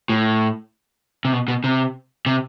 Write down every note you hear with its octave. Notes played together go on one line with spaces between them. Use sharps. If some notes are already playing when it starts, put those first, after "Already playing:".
A2
C3
B2
B2
C3
C3